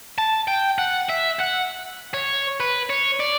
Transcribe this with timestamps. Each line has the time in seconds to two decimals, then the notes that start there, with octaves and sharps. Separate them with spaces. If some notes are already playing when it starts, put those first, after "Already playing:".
0.18 A5
0.48 G5
0.78 F#5
1.09 E5
1.39 F#5
2.14 C#5
2.60 B4
2.90 C#5
3.20 D5